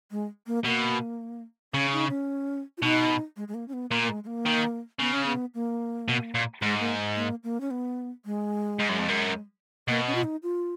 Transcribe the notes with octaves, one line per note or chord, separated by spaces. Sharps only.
G#3
A#3
B2 A#3
C#3 C#4
D#4
C#4
F4
B2 D#4
G#3
G#3
A#3
C#4
B3
A#2 A#3
A#3
G#3
G#3
A#3
D#3
C#3 B3
C#4
B3
A#3
B2
A#2
G#2 G#3
A#3
A#3
A#3
C#4
B3
G#3
G#2
F#2
F2
F#2
B2 A#3
C#4
F4
D#4
F4